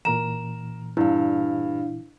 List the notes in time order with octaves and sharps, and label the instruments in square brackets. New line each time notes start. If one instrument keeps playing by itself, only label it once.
[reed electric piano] A#2 E3 [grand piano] A#4 A#5 [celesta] E7
[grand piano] G2 [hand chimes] D4 F5 [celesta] E4